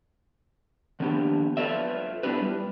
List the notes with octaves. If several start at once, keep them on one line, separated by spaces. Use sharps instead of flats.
D#3 F3 A#3 B3 D4 G4
F4 A4 B4 C#5 D5 E5
B3 C4 D4 E4 G4 B4
G3